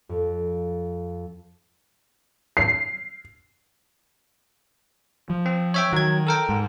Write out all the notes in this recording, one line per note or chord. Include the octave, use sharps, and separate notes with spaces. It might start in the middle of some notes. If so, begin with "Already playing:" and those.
F2
C7
F3
C4
C#5 E5 G5
D#3 F#3 G#6
A4 A#4 G5
G#2